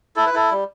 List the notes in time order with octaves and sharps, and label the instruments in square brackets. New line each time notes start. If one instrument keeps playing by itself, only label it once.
[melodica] E4 A4
B4
E4 A4
G3